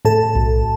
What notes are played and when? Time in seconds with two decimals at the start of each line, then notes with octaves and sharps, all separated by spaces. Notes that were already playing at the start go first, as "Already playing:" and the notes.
0.05 A2 A4 A5
0.35 B1